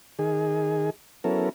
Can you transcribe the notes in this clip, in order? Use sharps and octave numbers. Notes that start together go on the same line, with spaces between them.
D#3 G#4
F#3 B3 C#4 E4 A4 A#4